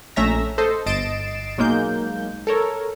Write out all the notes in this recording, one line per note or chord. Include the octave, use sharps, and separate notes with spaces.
A#1 A3 C#4 E5 A#5 A#6
A4 C5 D#5
G1 D#5 A6 C7 D7 E7
B1 F#3 G#3 A#3 D#4 G6
A4 A#4 C#5